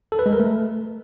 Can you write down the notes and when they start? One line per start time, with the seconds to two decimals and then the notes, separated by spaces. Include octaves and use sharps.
0.12 A4
0.19 B4
0.26 G#3
0.33 A#4
0.40 A3